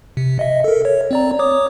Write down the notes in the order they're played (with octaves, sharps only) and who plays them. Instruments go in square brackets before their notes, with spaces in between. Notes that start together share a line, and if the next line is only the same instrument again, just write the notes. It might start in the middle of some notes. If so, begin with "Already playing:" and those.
[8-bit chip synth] C3
D#5 E5
A4 A#4
C#5
C4 D5 A#5
C#5 D6 D#6